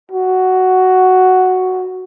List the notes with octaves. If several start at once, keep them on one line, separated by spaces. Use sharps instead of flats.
F#4